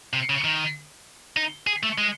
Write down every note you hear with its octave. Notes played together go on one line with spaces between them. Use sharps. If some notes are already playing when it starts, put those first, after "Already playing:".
C3
C#3
D#3
D#4
G#4
A3
G#3